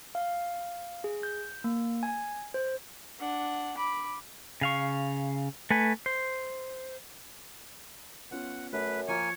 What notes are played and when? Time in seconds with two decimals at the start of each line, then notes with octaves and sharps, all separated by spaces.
0.15 F5
1.04 G#4
1.23 G6
1.64 A#3
2.03 G#5
2.54 C5
3.20 D4 F#5
3.77 B5 D6
4.61 C#3 F5 C#6
5.70 A3 B4 G#5
6.06 C5
8.31 B3 C#4 F4 F#5
8.73 F#2 A3 B4
9.08 F3 A#3 C#5 G#5